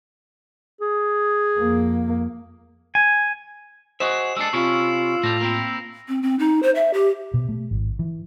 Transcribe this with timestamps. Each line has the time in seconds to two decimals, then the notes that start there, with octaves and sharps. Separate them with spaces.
0.81 G#4
1.59 F2 A#3
2.95 G#5
4.00 F#4 G#4 C5 D#5 E5 D#6 E7
4.37 G#3 D4 A4 E6 C7
4.53 C3 C#4 E4 F4 C#6
5.24 A2 G3 A3 A#6 F7
5.41 A#3 C4 E4
6.08 C4
6.23 C4
6.39 D#4
6.63 C5
6.75 E5
6.94 G4
7.34 B2
7.49 A3
7.71 G#1
7.99 E3